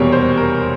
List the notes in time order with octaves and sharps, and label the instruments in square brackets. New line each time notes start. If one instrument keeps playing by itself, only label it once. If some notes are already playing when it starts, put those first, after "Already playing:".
Already playing: [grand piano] F1 E2 B2 G3 A#3 C#5
C5
A#4